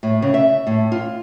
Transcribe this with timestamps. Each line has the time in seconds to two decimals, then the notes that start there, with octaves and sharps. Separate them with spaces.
0.03 A2
0.22 C#3
0.34 E5
0.67 A2
0.92 F4